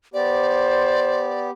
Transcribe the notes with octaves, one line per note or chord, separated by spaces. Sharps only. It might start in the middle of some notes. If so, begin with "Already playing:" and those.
B3 G4 C5 D5